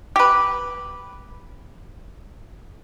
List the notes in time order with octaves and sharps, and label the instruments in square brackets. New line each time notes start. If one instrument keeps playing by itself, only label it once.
[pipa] G4 B4